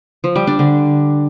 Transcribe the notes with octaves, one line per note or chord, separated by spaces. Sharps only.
F3
G3
D4
D3